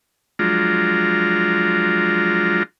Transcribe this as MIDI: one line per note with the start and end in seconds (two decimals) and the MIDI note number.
0.39 2.63 53
0.39 2.63 54
0.39 2.63 56
0.39 2.63 62
0.39 2.63 65
0.39 2.63 82